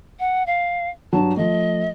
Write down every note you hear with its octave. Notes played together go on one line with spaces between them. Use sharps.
F#5
F5
G2 F#3 A5
F3 A3 D#5